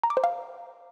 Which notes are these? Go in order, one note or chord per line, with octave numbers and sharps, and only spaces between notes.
A#5
D6
C5
F5